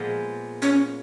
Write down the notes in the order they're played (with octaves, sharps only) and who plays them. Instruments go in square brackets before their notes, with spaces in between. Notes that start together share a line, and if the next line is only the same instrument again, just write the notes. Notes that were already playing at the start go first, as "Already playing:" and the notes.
Already playing: [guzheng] A#2 F3 G#3 B3
[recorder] C#4